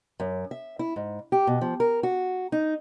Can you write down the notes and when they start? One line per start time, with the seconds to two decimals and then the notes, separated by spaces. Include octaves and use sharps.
0.20 F#2
0.51 E5
0.79 E4
0.96 G#2
1.32 G4
1.47 B2
1.61 F3
1.80 A#4
2.03 F#4
2.52 D#4